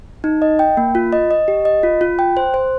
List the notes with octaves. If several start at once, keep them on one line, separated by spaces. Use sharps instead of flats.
D#4
D#5
G5
A#3
F4
D#5
D#5
G4
D#5
F4
F4
G5
C5
C5